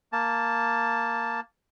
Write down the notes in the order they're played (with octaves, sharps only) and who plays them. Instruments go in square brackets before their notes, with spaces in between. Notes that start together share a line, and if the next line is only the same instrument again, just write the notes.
[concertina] A#3 A5